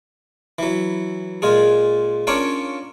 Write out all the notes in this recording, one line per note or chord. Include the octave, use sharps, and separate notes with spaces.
E3 F#3
A#2 G#3 F4 G#4
A#3 C#4 D4 F4 C#5 F5